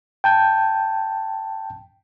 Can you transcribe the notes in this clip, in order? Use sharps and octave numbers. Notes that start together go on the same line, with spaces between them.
G5 A5 G6